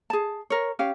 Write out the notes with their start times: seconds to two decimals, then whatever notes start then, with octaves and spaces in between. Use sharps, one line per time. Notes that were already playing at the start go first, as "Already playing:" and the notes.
0.10 G#4 A5
0.50 A#4 C#5
0.79 C#4 G4 F5